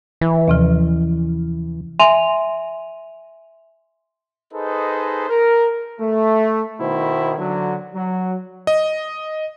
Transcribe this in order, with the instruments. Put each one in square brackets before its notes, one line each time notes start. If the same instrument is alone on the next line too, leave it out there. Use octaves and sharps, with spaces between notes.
[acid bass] E3
[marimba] D#2 C3 F3
[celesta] E5 G#5 C6 D#7 F7
[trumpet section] D#4 G#4 A4 B4 C5 D#5
A#4
[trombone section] A3
B2 D#3 E4 C5
D3 F#3
F#3
[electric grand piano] D#5